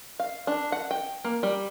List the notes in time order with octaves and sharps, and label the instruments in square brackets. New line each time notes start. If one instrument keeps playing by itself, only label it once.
[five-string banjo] F5
D4
F#5
G5
A#3
G3